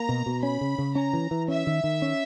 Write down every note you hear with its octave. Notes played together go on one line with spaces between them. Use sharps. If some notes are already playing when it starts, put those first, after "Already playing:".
Already playing: A#3 A#5
B2
B2
C#4 B5
C#3
C#3
C#4 A#5
E3
E3
C#4 E5
D#3
D#3
C#4